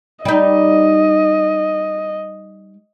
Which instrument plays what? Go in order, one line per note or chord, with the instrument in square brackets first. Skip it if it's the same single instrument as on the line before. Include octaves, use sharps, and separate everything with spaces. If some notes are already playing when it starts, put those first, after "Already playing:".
[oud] G3 D#4 [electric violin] D#5